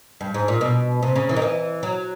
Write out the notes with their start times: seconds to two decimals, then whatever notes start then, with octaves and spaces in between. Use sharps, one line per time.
0.21 G2
0.34 G#2
0.48 A#2
0.61 B2
1.03 C3
1.16 C#3
1.29 E3
1.36 D#3
1.42 E3
1.83 F#3